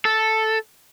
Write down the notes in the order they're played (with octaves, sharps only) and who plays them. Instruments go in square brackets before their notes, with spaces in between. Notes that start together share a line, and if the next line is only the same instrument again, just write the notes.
[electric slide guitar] A4